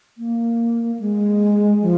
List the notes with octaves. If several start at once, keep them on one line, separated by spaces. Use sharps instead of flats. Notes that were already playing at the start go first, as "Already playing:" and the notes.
A#3
G#3
F3